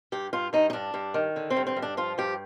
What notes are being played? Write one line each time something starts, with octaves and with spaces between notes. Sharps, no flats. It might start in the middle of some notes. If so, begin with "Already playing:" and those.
G2 G4
G2 F4
G2 D#4
D#4
G2 D4
G2
D#3
D3
C4
G2
C4
G2
D4
F3 F4
G2 G4